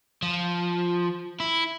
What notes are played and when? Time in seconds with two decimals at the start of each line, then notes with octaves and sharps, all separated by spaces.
0.22 F3
1.40 E4